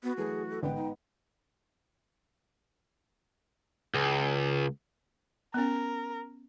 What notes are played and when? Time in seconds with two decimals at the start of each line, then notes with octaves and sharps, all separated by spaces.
0.03 B3 F#4
0.17 E3 F#3 A3 G#4
0.50 A4
0.63 A1 G#2 D3 B3 B4 G5
0.75 D#4
3.95 C#2
5.54 B3 C#4 A#4